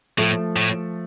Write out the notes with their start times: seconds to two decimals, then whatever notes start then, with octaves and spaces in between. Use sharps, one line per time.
0.18 A2 F3 A3
0.56 A2